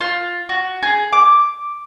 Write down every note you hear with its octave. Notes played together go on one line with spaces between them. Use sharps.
F4
F#4
G#4
D6